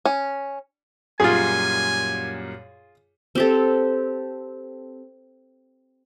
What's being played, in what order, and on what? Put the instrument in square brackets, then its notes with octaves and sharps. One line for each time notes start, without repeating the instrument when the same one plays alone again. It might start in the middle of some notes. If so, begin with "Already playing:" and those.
[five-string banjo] C#4
[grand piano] F#2 A#2 G3 [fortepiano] F4 G#4 [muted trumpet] G#5
[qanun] C4 G4 A4